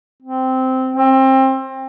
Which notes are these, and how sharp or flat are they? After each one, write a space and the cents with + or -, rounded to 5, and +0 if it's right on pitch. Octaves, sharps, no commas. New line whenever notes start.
C4 -10
C4 +25